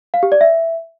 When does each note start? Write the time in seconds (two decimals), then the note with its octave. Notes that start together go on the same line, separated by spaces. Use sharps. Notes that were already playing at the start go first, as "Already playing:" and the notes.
0.14 F5
0.23 G4
0.32 D5
0.41 E5